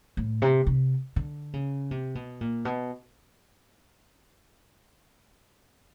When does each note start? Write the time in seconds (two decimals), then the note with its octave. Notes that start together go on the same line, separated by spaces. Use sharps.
0.17 A2
0.42 C3
0.67 C3
1.16 D3
1.53 C#3
1.91 C3
2.15 B2
2.41 A#2
2.65 B2